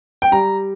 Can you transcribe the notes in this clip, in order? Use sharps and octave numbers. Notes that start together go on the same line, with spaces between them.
G5
G3 A#5